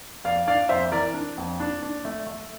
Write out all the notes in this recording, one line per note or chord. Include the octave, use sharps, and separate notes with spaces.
F2 D5 F5
D4 D5 F5
F2 C5 E5
E3 A#4 D5
D4
F2
D4
D4
A3
A3